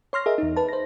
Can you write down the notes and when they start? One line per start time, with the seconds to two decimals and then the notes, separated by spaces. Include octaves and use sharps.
0.13 C#5 C6 F6 A#6
0.26 G#4 A#4 D#5 E5
0.38 E2 D#4
0.56 B4 A5
0.69 C5 A#6